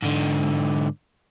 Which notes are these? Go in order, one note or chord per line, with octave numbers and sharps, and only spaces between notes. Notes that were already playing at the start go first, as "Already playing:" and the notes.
G#2 D3